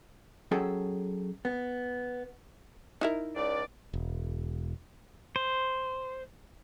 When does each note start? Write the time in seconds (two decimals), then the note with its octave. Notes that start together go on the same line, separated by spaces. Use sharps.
0.51 F#3 C#4 G#4 A4 G5 A5
1.45 B3
3.01 D#4 E4 A#4
3.36 C#2 D5
3.93 E1
5.36 C5